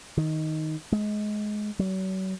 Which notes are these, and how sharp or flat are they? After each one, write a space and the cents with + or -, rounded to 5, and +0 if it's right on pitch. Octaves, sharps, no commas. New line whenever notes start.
D#3 +5
G#3 +20
F#3 +35